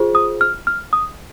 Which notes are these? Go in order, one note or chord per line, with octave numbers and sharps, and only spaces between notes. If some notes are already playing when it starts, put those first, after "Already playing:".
Already playing: F4 G#4 C5
D#6
F6
F6
D#6